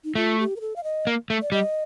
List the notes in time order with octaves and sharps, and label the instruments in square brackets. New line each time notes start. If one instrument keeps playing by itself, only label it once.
[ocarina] D#4
[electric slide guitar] A3 [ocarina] F4
[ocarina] G4
A#4
A4
F5
D#5
[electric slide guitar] A#3
A3
[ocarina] D5
[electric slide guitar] G3 [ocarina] D#5